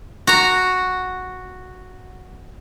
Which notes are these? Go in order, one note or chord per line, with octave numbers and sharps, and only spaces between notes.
F#4 A#5